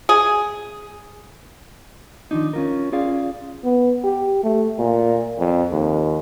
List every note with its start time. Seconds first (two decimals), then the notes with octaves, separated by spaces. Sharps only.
0.09 G#4
2.31 D#3 F3 D4 D#4
2.53 C#4 F4 A#4
2.92 C#4 F4 G#4 D5 F5
3.64 B3
4.04 G4
4.43 A3
4.79 A#2
5.39 F2
5.72 D#2